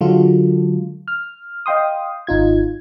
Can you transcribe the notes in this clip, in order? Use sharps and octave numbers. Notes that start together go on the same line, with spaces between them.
D3 F#3 G#3 F4 F#4 A4
F6
D#5 F5 G5 C6 D#6
G#1 D#4 F4 G#6